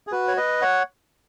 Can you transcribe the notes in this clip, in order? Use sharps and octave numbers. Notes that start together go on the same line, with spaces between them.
G#4
F#4 B4
C#5
B4 D#5
C#5 F#5